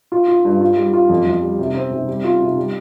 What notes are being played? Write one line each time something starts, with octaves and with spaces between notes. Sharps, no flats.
F4
F4
G2
F4
G3
F4
F2
F2
G3
C3
C4
C3
G3
F4
C3
G3